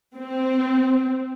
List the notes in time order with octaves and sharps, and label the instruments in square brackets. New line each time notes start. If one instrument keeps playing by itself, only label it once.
[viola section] C4